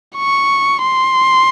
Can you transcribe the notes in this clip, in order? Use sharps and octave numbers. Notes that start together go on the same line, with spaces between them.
C#6
C6